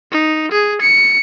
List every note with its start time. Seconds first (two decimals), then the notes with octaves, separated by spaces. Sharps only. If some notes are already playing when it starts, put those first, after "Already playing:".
0.11 D#4
0.51 G#4
0.81 C#7